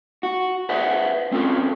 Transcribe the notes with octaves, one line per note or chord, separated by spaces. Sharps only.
F#4
B4 C5 D5 E5 F#5
C4 C#4 F4 A4